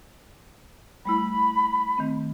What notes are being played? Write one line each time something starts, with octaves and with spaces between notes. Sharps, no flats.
G3 A3 E4 B5
D#3 A3 C4